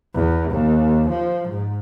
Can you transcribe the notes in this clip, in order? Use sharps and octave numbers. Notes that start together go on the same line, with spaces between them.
E2
D#2
F3
G#2